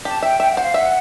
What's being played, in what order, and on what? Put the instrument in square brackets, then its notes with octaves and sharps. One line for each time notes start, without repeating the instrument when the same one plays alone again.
[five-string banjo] G4 [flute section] A5
[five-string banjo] E5 [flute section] G5
[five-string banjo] E5 [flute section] G5
[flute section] F#5
[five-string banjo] C5
[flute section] F5
[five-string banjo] E5 [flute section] F#5